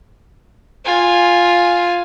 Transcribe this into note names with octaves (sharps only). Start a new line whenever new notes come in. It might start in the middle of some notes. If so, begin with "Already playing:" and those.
F4 G#5